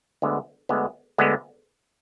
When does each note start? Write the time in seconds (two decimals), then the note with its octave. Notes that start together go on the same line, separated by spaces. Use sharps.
0.22 D2 D3 G#3 B3
0.69 D2 D3 G#3 B3
1.18 D2 D3 G#3 B3